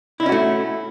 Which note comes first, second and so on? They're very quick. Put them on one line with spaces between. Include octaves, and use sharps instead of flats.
E4 D#4 C#4 F#4 A3